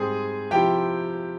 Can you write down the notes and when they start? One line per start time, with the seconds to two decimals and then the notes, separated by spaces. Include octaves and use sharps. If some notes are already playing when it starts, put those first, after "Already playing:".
Already playing: G#2 G3 C4 G#4 G#5
0.51 C3 F3 C4 E4 G4 G5